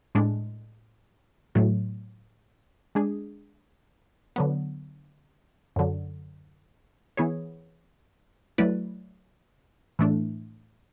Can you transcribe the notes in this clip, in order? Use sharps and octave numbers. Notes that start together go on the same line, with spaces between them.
A2 G#3 D4
A2 F#3 A3
G#3 D4 G#4
D3 F#3 B3
F#2 D3 F#3
E3 B3 E4 G#4 C#5
F#3 A3 E4 B4 D5
A2 E3 A3 D4